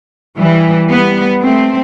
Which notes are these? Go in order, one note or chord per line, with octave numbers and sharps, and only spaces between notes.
E3 G3
G3 B3
A3 C4